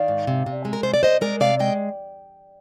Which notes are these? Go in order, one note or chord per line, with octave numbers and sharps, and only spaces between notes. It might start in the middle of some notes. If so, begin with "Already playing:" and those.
Already playing: D#3 D5 F5
G#2
C3
C3
G#3
A#4
C3 C5
D5
C3 C5 D#5
G#3 A#4 D5
C3 D5 F5
G#3 D#5 G5